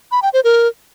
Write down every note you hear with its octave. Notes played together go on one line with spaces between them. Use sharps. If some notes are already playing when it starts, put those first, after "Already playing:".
B5
G5
C5
A#4